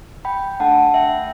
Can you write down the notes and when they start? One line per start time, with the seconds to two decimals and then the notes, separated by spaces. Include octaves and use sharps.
0.25 G5 B5
0.60 A3 D4 A4 F#5 A5
0.94 E5 G5